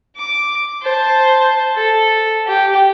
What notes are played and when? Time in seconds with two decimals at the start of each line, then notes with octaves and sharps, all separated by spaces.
0.17 D6
0.82 C5 A5
1.75 A4
2.47 G4